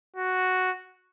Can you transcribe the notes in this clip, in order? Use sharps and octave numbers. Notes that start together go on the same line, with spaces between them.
F#4